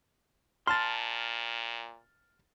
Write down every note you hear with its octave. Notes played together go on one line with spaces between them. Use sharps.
A#2 A5 C6 F6 A6